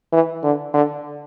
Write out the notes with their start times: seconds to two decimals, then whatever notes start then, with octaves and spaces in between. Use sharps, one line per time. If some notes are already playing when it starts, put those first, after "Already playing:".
0.13 E3
0.44 D3
0.74 D3